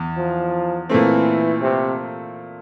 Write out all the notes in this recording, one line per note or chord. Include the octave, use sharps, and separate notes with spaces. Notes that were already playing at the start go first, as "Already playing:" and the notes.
Already playing: E2
F3
A#2 E3 A3 C4
C3